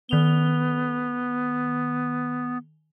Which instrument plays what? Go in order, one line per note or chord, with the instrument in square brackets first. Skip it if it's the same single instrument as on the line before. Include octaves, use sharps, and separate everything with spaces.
[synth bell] D#3 F7 G7 [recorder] B3